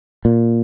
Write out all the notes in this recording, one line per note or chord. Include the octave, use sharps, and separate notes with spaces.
A#2